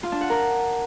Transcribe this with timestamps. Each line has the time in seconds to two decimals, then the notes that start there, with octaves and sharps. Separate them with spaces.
0.03 F4
0.12 D4
0.21 F#5
0.30 A#4